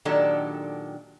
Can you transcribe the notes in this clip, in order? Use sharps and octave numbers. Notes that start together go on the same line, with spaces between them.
A#2 D#3 F#3 D4 G4 A4